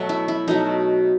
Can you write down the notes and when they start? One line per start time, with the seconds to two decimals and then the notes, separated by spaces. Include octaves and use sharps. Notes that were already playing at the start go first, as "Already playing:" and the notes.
Already playing: B2 F#3 A3 B3
0.09 E4
0.28 E4
0.48 B2 F#3 A3 D#4